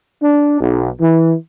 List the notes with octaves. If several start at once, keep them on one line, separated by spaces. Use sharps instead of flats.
D4
B1
E3